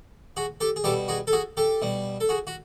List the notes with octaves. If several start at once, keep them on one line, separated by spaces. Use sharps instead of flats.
F#4 G#4
G4 A4
G#4
B2 G3 G4 A4
F#4 G#4
A4
F#4 G#4
G4 A4
B2 G3
A4
F#4 G#4
F#4